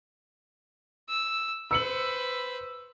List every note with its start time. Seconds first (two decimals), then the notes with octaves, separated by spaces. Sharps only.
1.09 E6
1.71 B4 C5 E6 C#7 F#7